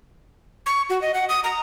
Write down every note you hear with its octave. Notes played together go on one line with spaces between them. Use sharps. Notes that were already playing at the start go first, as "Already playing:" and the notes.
C#6
F#4
D#5
F#5
D#6
A#5